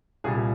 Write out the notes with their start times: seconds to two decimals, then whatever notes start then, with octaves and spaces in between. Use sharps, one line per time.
0.24 C2 A#2 G3 G#4